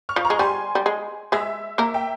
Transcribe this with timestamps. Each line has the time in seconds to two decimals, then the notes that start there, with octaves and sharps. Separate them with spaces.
0.09 C#6 F6
0.16 F3
0.25 A#5 C#6
0.30 G#3
0.39 G3 G#5 C6
0.75 G3
0.86 G#3
1.32 G#3 G#4 E5
1.78 A#3 A#4 E5
1.94 E5 G5